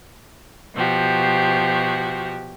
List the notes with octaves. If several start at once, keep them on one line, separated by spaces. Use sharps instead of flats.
B2 F3 F#4 G4